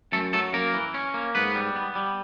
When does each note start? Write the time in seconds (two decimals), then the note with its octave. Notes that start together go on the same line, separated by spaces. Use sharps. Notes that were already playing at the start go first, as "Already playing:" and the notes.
0.12 F#2 A3 A4
0.33 F#3 A3 A4
0.53 F#2 A#3 A#4
0.74 E3
0.94 C#4
1.14 A#3
1.35 G#2 B3 B4
1.55 G3
1.76 B3
1.95 G3